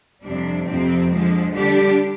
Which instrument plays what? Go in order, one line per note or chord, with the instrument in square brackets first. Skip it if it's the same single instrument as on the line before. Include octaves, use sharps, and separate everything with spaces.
[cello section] F2 C3 G3 D4
F2 C3 F3 C4
D3 F3 G#3
D3 G3 D4 G4